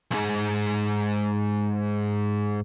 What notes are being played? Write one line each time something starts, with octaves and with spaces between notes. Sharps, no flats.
B1 G#2